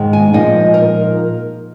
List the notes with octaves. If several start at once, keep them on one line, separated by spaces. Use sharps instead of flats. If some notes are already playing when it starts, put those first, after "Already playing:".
Already playing: G#2 D#3 G#3
G#5
A#2 F3 G#3 D#4 D#5
A#4